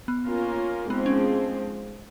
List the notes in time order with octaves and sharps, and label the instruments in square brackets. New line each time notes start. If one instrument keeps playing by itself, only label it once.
[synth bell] B3
[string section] A#3 C#4 F4 A#4
[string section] G#2 F3 G#3 C4 [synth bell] B3
[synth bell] C#4